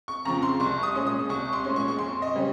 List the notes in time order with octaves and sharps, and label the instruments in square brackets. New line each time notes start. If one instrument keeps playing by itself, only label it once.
[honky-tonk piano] C#6
F2 C#3 F3 C4 A#5
C6
C2 C#6
D#6
A#2 G#3 C#4
D#6
C2 C#6
C6
A#2 G#3 C#4
C#6
C#6
F2 C6
D#5
C#3 G3 C#4